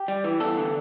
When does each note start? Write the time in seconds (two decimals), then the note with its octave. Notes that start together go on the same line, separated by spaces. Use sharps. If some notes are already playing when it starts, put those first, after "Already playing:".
Already playing: G4
0.08 G3
0.24 E3
0.40 E2 A4
0.57 D3